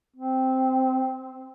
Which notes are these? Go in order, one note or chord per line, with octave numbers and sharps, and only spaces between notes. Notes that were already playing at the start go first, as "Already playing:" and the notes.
C4